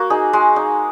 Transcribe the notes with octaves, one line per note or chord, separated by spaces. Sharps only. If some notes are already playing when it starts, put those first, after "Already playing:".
Already playing: A#3 F#4
D#4 G#4
G#3
D#4